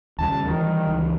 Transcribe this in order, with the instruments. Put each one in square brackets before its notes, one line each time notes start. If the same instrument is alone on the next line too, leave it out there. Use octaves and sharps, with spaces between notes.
[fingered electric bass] D#2 C#3 G3 [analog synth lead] A5
[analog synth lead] D#3 [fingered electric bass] E3 G3
[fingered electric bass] C#2 E3